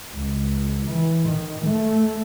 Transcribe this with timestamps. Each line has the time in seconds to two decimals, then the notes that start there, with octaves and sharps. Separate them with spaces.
0.16 C#2
0.87 E3
1.28 D#3
1.67 A3